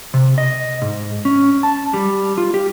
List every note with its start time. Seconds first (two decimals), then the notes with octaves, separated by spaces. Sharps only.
0.14 C3
0.38 D#5
0.82 G#2
1.25 C#4
1.63 A5
1.94 G3
2.38 F4
2.54 G4